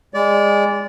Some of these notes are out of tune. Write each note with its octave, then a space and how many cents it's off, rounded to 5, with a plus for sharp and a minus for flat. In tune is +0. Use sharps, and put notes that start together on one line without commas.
G#3 -25 D5 -20